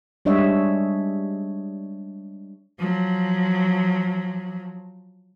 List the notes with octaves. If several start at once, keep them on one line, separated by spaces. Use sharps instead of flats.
G3 G#3 D4 C#5 D#5 E5
F3 F#3